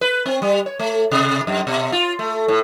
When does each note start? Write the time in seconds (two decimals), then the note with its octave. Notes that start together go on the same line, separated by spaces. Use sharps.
0.01 B4
0.26 C4
0.42 G3
0.66 C#5
0.79 A3
1.11 C3
1.47 F#2
1.67 B2
1.92 F4
2.19 A3
2.48 A2